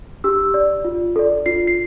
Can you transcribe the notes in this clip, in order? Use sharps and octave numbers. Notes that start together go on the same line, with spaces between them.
G4 E6
D5
F4
A4 D5
F4 C7
C7